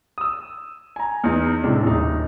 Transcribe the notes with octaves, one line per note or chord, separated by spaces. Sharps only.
D#6 E6
G#5 A#5
E2 D#4
A2 C3 G#3 D4
D#1 D#4